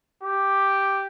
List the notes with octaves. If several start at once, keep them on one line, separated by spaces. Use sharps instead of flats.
G4